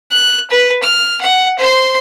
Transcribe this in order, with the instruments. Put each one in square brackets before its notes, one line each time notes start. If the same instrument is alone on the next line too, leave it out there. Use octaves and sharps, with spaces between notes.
[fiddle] F#6
B4
F6
F#5
C5 C6